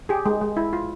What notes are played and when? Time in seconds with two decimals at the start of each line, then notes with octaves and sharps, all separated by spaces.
0.09 G4 G#4
0.26 G#3
0.42 G#3
0.57 E4
0.73 F4